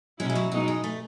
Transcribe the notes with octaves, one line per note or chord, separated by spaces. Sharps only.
B2 F#3 G#3 C#4 E4
G#3
F#3
B2 F#3 G#3 D#4
G#3
A3